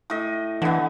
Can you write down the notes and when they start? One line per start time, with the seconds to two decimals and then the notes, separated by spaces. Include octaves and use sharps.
0.10 A2 D#5
0.62 D3 E3 B3